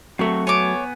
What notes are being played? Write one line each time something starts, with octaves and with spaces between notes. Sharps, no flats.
F#3 A3 C4 F#4 C#6
B3 C#5 G#5 D6